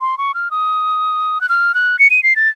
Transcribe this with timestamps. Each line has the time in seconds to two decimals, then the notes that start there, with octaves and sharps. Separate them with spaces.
0.01 C6
0.18 C#6
0.34 F6
0.51 D#6
1.41 F#6
1.49 F6
1.75 F#6
1.99 C#7
2.10 D#7
2.23 C7
2.36 A6